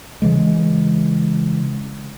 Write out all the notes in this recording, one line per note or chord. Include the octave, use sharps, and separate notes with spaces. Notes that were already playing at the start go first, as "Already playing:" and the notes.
C#3 E3 G#3